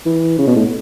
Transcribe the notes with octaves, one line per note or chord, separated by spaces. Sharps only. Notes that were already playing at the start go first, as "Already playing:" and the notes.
E3
C#3
B2
A2